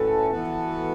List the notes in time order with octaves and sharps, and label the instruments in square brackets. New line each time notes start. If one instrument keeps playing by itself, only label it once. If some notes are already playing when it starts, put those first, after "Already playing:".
Already playing: [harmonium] A2 A3 C#4 F#4 B4 [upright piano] A4
[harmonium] E3 B3 F#4 B4